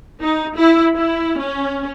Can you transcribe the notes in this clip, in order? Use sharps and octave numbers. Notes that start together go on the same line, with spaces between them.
D#4
E4
E4
C#4